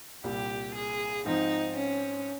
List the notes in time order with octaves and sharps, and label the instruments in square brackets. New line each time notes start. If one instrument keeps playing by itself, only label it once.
[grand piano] C2 A#2 G3 [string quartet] G4
[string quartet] G#4
[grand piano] G#2 F3 C4 [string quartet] D#4
[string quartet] C#4